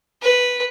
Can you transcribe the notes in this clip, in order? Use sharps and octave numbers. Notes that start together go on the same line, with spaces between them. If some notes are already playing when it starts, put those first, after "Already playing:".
B4